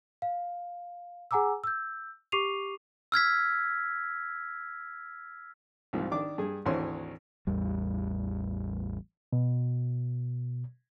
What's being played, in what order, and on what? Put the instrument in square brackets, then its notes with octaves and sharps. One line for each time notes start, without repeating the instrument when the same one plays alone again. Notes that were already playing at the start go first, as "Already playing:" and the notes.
[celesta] F5
G#4 F#5 G#5 A#5 D6 E6
E6 G6
G4 C#6 D6 C7 D#7 F7
[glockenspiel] E6 F6 G#6 B6
[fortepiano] C2 G#2 F3
D#3 D4 D6
G2 G#4
G#1 D2 E3 C5 C#5 C6
[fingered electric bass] A1 E2 G3
[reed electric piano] B2